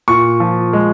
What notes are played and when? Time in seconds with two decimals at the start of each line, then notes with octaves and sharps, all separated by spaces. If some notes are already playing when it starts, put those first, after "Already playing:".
0.08 A#2 C#6
0.40 F3
0.73 G#3